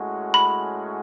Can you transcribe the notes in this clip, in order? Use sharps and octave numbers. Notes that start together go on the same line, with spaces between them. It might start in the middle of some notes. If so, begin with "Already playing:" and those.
Already playing: A2 G#3 C#4 F#4
B5